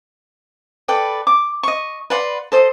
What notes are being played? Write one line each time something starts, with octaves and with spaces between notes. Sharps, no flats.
A4 B4 D5 G5
D6
D#5 C#6
B4 D5 F#5 C6
A4 C5 D#5